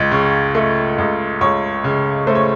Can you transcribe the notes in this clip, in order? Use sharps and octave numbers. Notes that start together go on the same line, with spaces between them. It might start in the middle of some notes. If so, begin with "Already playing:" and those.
Already playing: C#2 D#5
C#3
A3
C#2
C#2 C#5
C#3
A3 C5
C#5